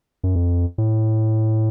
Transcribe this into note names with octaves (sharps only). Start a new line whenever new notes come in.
F#2
F2
A2